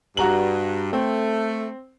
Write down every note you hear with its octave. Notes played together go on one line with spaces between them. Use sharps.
G2 F#4 A#5 F#7
A3 C4